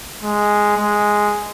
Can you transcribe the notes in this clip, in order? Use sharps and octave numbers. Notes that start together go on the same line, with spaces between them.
G#3
G#3